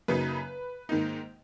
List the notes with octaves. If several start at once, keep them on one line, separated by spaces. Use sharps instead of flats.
F#2 C#3 F#3 A#3 D#4 B4
G#2 D#3 A#3 D#4